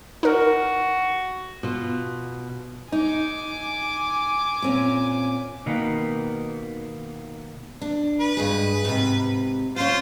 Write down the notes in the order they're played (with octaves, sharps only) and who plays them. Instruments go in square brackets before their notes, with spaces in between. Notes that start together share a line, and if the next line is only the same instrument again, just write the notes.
[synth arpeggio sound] D#4 A#4 [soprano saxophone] F#4
[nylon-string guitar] B2 F4
[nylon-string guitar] D#4 [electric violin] G#5 D6
[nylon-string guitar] A#2 C4 C#4
[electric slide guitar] B2 D#3 A#3 B3
[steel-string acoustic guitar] D4
[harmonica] B4
[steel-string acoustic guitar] G2 G#3 G#4
G#2 C3
[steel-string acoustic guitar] C#4 F5 [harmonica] F4 C5